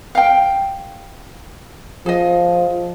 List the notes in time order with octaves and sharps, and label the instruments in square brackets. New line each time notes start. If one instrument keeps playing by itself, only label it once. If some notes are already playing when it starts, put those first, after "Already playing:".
[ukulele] F5 G5
[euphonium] F3 [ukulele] G#4 D#5